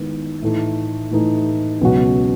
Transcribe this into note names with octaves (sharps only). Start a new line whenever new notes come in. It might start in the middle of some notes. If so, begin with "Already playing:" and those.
Already playing: D#3 G#3 B3 E4
A2 E3 A3 D#4
A2 E3 A3 D#4
C#2 B2 F#3 C#4 F#4